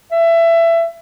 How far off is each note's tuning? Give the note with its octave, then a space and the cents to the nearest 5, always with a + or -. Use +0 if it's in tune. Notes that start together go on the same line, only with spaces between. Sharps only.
E5 +20